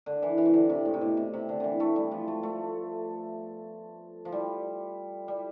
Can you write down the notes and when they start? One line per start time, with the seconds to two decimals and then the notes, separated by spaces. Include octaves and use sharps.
0.06 D3
0.22 E3
0.38 E3
0.45 C3
0.54 D3
0.69 C3
0.86 A2
0.94 C3
1.01 B2
1.17 C3
1.33 C3
1.49 D3
1.60 D3 E3
1.80 A3
1.96 G3
2.11 F3
2.28 A3
2.43 A3
4.25 F3
4.32 G3
5.28 G3